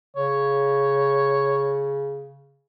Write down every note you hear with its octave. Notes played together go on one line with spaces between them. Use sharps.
C#3 C#5